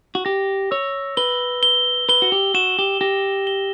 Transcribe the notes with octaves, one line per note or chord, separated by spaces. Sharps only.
F#4
G4 A#6
C#5 E6
B4 G7
G7
B4 G7
F#4
G4
F#4 E7
G4
G4 A#6
G7